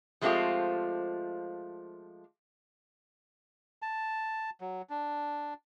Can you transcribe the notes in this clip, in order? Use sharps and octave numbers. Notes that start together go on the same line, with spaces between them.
F3 G#3 A3 C4 F4 G4
A5
F#3
D4